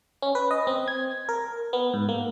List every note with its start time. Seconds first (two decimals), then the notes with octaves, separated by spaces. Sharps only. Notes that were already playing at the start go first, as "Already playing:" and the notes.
0.22 C#4
0.35 B4
0.51 D#5
0.67 C4
0.88 G#6
1.29 A#4
1.73 B3
1.94 G#2
2.09 A#3